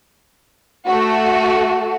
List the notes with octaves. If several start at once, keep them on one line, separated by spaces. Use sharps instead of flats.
A3 F#4